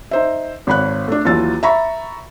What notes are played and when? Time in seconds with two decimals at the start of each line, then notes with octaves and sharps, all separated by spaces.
0.11 D#4 C5 E5
0.67 G#1 C#5 B5 F#6
1.08 A3 D4
1.25 D#2 E3 F#3 F4 E6 A6
1.63 E5 A#5 B5 C#6